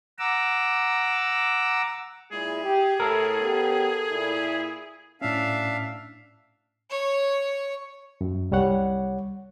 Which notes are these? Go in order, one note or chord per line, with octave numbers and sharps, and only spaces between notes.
F#5 A#5 D6 E6
A#2 G#3 E4 G#4
G4
A2 A4 A#4
C#3 B3 G4
A#2 E4
A2 C#4 D4 E5 F5
C#5
F#2
C2 G3 C#5 F#5